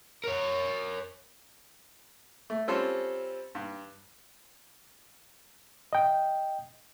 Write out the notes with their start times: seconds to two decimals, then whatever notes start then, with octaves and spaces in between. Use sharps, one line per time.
0.24 A#4 C#5
2.50 A3
2.68 G3 C4 C#4 F4 A4 C5
3.55 G2
5.93 D#5 G5